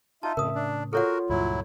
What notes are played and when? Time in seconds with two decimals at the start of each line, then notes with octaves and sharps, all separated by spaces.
0.23 D#4 F4 E5 A5
0.37 F2 A2 C#3 A#4 D#6
0.55 D4
0.93 F4 F#4 A4 A#4 C#5 F#5
1.29 C#2 G2 A#2 F#3 E4